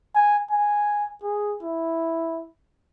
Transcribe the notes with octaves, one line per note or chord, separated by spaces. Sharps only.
G#5
G#5
G#4
E4